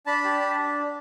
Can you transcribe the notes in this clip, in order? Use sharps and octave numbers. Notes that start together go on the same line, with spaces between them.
D4 A5 B5
G4
D4